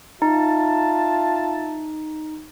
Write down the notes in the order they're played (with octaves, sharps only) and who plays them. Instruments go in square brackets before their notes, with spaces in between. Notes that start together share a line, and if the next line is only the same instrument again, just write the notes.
[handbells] D#4 [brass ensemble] F4 E5 A5